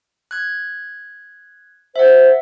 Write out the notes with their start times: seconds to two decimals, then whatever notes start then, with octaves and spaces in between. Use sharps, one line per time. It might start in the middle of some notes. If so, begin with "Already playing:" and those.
0.31 F#6 G#6
1.96 C5 E5 F#5